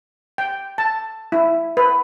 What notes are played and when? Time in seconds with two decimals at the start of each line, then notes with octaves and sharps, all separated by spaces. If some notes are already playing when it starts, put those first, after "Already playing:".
0.38 G5
0.78 A5
1.32 E4
1.77 B4